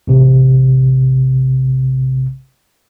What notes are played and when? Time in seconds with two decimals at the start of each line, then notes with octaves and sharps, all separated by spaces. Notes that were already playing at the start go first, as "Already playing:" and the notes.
0.07 A1 C3